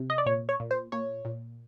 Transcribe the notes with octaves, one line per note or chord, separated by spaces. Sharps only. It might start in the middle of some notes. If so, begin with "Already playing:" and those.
Already playing: C3
D#5
D5
A#2 C#5
C#5
A#2
C5
A#2 C#5
A#2